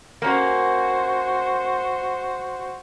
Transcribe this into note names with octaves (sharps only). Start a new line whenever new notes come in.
A#3 C#4 F#4 C5